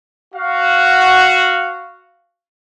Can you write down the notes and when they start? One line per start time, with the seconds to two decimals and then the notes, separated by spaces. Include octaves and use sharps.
0.34 F#4 F5